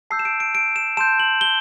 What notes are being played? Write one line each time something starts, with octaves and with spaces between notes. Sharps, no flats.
A5 E6 G6 C7
E7
D7
D7
D7
E7
A5 C6 G6 E7
F#7
G7